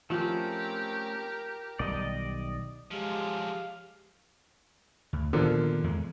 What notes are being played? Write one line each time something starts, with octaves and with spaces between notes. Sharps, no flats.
F3 A3 C4 C#4 G4 A#4
B1 D#3 G3 D5 D#5
F3 F#3 G#3 G4 F5
D2
A#2 D3 D#3 F3 A#3 B3
E2 G#3